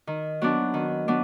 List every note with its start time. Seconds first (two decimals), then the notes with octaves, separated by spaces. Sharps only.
0.07 D#3
0.42 F#3 B3 D4
0.74 D#3
1.08 F#3 B3 D4